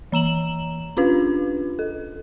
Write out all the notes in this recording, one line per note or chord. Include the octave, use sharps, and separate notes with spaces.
E3 A#5 E7 F#7
C#4 D4 F4 B4
A4